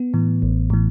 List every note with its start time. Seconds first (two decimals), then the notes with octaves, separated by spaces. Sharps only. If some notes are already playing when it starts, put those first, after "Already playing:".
Already playing: B3
0.14 A2 E3
0.42 A1
0.70 A2 E3